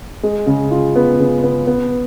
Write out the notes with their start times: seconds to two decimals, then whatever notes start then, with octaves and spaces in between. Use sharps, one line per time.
0.23 G#3
0.47 C#3
0.71 F4
0.96 B3
1.19 C#3
1.44 B3
1.67 B3